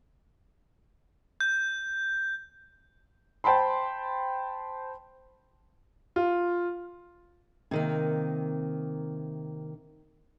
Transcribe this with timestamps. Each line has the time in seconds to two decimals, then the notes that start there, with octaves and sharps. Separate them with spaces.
1.40 G6
3.44 C5 G5 A5 B5 C6
6.16 F4
7.71 C3 D#3 A#3